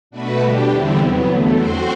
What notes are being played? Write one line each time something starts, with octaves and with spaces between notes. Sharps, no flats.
B2 A3 D4 F#4 B4
D3 G3 D4 G4
E2 D3 G3 C4 E4
C3 F#3 B3
E2 D3 A3
F#3 C4 F#4 C5